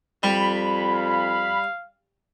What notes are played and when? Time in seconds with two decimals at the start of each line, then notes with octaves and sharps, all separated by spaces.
0.23 F2 G3 B5
0.92 F5